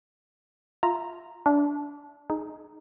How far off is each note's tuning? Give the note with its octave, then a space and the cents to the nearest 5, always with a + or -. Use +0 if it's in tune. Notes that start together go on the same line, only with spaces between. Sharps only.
F4 +0 E5 +0 A#5 +0
D4 -20 E5 +0
D#4 +0 G#4 +20